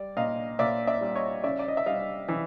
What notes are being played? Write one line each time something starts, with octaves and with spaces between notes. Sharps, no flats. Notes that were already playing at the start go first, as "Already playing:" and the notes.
Already playing: G3 D5
A#2 D#5 F5
A#2 D5 E5
D5 E5
G3
C#5 D#5
C#3 D5 E5
D5
D#5
E5
G3 D#5 F5
E3